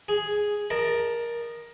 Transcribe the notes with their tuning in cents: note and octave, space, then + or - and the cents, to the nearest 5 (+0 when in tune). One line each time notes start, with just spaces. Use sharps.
G#4 +0 D#6 +0
A#4 +15 D#5 -20 A5 +0